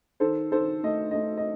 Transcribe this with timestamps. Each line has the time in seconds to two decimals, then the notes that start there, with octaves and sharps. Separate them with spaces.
0.20 D#3 A4 C5
0.52 D#3 A4 C5
0.83 A3 D#5
1.11 A3 D#5
1.37 D#5